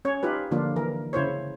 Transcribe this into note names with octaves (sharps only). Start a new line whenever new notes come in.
C#4 C#5
D#4 F4 G4 B4
D3 F3 A#3 D4 F4
E3 A#4
C#3 E4 C5 C#5